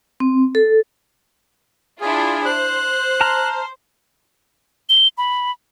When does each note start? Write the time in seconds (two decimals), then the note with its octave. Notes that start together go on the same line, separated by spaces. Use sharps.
0.20 C4
0.55 A4
2.01 D4 E4 F4 G#4
2.45 C5 F#6
3.21 A5 A#5 F6
4.89 G7
5.18 B5